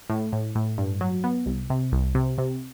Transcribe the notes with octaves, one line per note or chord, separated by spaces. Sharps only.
A2
A2
A2
G2
F#3
B3
C2
C3
C2
C3
C3